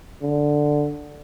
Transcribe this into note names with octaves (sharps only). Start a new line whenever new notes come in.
D3